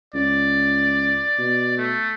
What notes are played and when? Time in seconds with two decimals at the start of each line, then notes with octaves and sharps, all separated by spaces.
0.14 C#2 D5
1.38 B2
1.78 A3